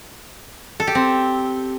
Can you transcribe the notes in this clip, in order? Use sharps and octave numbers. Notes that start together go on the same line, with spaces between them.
A4
G4
C4